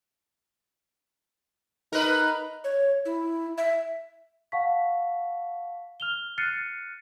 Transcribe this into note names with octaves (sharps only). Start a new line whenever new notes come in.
D#4 A#4 B4
C#5
E4
E5
F5 F#5 A5 C#6 B6
F6 F7 G7
F6 F#6 A6 C7 C#7 D#7